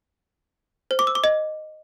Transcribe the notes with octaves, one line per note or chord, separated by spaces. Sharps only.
C5
D6
E6
D6
D#5